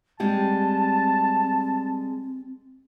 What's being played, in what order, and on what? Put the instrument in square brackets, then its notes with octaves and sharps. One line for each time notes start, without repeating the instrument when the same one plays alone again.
[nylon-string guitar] G3 G#3 G4 [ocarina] C4 [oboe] A5